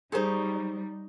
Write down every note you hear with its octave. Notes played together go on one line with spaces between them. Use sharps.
G3 D#4 G4 G#4 C5 C#5